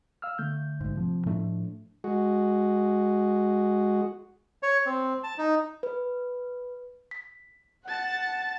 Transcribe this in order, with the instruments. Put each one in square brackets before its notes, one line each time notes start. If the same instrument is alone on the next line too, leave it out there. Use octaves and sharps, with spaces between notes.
[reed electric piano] F5 E6 F6
D3 A3 G6
[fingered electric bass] B1 G#2
[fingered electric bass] C3 [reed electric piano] F3
[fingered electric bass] A2 A3 D4
[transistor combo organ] G#3 F#4
[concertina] C#5
C4
A5
D#4
[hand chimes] B4
B6
[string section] F#5 [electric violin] A5 A6